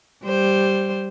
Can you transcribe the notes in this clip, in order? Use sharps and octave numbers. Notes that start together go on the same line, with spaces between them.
G3 C5